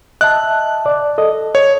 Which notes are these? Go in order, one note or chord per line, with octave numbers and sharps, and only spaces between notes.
D#5 E5 A5 F#6
D5
A4 D#5
C#5